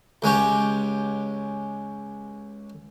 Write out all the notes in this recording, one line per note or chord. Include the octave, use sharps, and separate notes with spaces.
C#2 G#3 C#4 G4